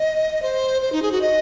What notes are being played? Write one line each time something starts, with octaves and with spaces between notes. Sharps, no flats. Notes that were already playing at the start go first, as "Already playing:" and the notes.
Already playing: D#5
C5
C5
D#4
G#4
F#4
D#5